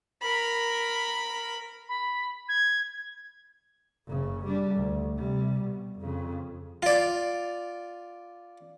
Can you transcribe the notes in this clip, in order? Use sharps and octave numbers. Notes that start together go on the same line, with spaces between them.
A#4 B5
B5
G#6
F#1 C#3
G3 D4
D2
C3 G3
B2
F2 C#3
F4 D5